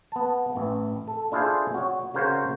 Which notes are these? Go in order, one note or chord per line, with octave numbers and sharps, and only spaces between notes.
B3 A5
A1 E3
A4
D4 E4 F4 G#4 A4 C5
F#4 C#5
C#3 F#4 A#4 C5 C#5